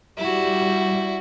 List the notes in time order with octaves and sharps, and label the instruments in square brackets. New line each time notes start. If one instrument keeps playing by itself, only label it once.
[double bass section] G3 [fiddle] E4 F#4